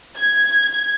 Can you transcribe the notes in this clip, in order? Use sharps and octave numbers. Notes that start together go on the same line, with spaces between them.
G#6